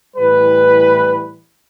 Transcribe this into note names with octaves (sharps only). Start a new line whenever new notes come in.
A2 E3 G3 B4